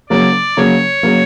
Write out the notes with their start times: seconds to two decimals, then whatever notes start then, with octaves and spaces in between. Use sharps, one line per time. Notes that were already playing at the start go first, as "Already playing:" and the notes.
0.10 C#3 F#3 A#3 D5
0.57 C#3 F#3 A#3 C#5
1.03 C#3 F#3 A#3